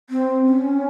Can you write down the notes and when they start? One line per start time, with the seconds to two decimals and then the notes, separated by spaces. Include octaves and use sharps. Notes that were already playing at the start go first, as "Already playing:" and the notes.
0.10 C4
0.45 C#4